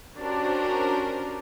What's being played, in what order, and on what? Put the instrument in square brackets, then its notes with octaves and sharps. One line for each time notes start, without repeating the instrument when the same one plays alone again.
[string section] C#4 D4 F#4 G4 A#4 C5